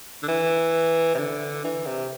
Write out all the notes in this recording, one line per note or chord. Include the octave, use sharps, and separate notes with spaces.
D3
E3
C3
D3
E3
C3